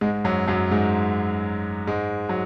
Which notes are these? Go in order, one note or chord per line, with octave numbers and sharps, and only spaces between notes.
G#2 G#3
F#2 F#3
F#2 F#3
G#2 G#3
G#2 G#3
F#3